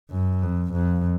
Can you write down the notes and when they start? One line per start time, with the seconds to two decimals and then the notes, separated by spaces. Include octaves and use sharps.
0.10 F#2
0.42 F2
0.73 F2